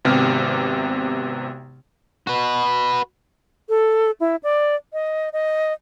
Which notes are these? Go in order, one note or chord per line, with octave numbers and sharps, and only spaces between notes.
G#1 C3 B3 G4 F6
F#4 B4
A4
E4
D5
D#5
D#5